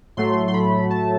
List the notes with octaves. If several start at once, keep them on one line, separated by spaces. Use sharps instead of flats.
A2 F#3 A3 C6
C6
B5
A5